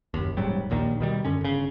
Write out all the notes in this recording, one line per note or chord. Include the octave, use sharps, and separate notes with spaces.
F#1 D#2
D#1 G#2 F#3 G3
A#1 D#2 A#2 D#3
B2 D#3 G3
F#2 D3 C#4
G1 C#3